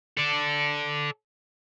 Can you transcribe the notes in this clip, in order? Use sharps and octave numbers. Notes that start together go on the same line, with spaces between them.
A4 D5